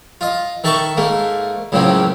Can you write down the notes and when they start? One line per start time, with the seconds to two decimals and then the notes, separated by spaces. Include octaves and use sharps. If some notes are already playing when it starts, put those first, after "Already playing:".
0.21 F4 D#5
0.64 D#3 A4 E5 A5 C#6
0.97 G#2 A3 A#3
1.72 C#2 F#2 A2 C#3 F#3 C4